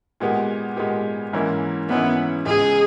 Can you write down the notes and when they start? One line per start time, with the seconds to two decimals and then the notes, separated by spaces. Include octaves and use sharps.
0.20 A#2 G#3 B3 G4
0.77 A#2 G#3 B3 G4
1.33 G#2 E3 A#3 C#4 E4
1.89 G#2 E3 A#3 B3 C#4 E4
2.45 C#2 C#3 G#3 G#4